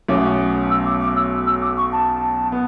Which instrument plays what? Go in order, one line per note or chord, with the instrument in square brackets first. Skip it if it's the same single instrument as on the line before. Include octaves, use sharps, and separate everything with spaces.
[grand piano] B1 B2 A3 C#4 [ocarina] D6
[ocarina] E6
D6
D6
E6
E6
D6
C#6
A5
[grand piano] B3